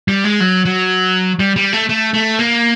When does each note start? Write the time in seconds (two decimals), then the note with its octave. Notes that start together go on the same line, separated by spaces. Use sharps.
0.08 G3
0.24 G#3
0.40 F#3
0.66 F#3
1.39 G3
1.56 G3
1.73 A3
1.89 A3
2.14 A3
2.39 A#3